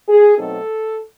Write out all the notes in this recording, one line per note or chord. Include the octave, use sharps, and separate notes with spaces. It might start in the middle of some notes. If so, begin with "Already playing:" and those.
G#4
B2 F#3 A3 C4 D#4 A4